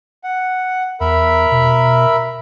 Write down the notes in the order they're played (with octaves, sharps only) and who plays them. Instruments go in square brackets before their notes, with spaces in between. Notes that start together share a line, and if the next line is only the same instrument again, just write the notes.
[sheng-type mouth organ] F#5
[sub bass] E2 [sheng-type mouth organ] A#4 E5 B5
[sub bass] B2